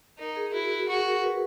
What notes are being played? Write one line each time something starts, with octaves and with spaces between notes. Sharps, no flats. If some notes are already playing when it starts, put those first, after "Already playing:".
D#4 A#4
G#4
E4 F#4
F#4
F#4 G#4
A#4
B4